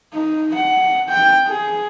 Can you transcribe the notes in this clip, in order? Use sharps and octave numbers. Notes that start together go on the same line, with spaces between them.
D#4
F#5
G5
G#4